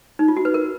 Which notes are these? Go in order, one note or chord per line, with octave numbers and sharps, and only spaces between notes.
D#4
F4
F#4
B4
A#4